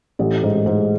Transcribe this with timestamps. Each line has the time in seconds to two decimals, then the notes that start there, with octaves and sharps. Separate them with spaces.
0.19 A1 A2
0.43 A1 G#2
0.66 G#2 G#3